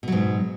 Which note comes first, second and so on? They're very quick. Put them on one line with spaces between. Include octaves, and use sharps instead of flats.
B2 F#3 G#2